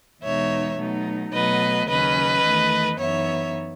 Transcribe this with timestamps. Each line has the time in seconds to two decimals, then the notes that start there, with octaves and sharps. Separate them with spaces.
0.22 E2 B2 G#3 D#4 C#5 E5
0.78 B2 F#3 A3 D#4
1.33 B2 F#3 A3 B4 D#5
1.88 D#2 C#3 F#3 C#4 B4 D#5
2.44 E2 D#3 A3
2.98 F#2 E3 B3 D#4 C#5 E5